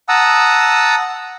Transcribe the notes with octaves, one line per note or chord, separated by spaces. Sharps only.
F#5 A5 A#5 D#6 E6